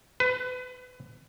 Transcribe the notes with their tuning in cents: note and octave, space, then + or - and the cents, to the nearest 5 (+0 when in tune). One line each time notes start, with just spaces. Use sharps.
B4 +25